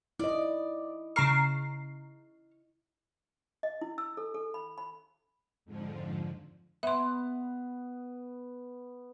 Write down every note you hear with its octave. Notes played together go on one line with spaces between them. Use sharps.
E4 D5 D#5
C#3 A#5 C#6 F6 C7
D#5
E4
E6
A4
A4
B5
B5
F2 G#2 D3 F3
B3 E5 C6